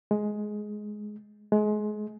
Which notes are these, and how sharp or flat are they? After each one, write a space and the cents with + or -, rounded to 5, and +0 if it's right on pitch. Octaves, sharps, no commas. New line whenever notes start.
G#3 +15
G#3 +30